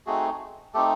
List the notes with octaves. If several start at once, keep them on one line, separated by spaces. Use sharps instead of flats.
A3 C4 D#4 F#4 G#4
A3 C4 D#4 G4 A4